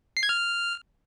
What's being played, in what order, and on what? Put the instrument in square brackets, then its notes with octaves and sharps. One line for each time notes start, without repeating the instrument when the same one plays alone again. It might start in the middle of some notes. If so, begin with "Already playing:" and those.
[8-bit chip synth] C7
G#6
F6